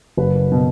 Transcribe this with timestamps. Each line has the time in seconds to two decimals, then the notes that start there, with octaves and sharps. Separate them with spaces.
0.17 F#1 B4
0.52 B2